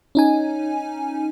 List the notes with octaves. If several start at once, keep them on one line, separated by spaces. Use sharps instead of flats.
C#4 D#4 G#5